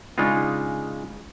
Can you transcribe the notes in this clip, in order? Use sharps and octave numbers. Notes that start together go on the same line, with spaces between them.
C#3 G#3 D4 D#4 F4